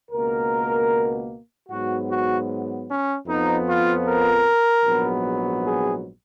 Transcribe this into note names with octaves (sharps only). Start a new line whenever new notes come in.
C#2 B2 A#3 A#4
G#2 F#3 B3 F#4
F#4
C#4
F2 F3 B3 D#4
F4
A#4
A#1 G#2 F#3 B3
G#4